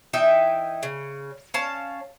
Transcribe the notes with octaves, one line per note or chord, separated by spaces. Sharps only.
E3 D#4 E5 G5
C#3
C#4 F5 A5